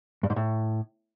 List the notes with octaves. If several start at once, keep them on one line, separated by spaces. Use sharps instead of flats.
G2
G#2
A2